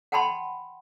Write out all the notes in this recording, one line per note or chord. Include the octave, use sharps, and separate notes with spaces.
F#5 G5 A5 B5 C6